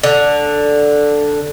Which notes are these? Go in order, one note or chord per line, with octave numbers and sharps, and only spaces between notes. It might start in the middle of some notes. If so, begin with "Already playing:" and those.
D3